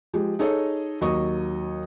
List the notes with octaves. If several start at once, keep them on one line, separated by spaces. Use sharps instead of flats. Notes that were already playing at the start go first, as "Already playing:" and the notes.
F3 G#3 G4
D#4 G#4 A4 C#5 D#5
D#2 F#3 D#5 C#6 D#6